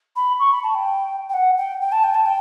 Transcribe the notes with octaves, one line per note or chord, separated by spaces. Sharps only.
B5
C#6
B5
A5
G5
G5
F#5
G5
G5
A5
G5
A5
G5